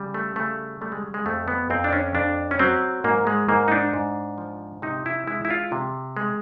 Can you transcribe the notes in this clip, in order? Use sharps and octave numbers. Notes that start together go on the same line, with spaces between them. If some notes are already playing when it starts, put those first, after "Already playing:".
Already playing: C#3 G3
A3
C#3 A3
G3 A3
G#3
G#3
F2 A3
B3
F2 C4
D4
C#4
F2 D4
C#4
F#3 C4
G#2 A#3
G#3
G#2 A#3
D#4
D4
G#2
F3
C3 D#4
E4
G#3 E4
E4
F4
C3
G#3